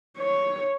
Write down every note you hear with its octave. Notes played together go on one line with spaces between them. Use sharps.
C#5